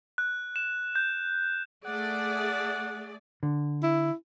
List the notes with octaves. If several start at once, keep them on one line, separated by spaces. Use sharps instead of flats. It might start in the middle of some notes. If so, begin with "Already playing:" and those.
F#6
E7
G6
A3 G#4 D5 F#5
D3
E4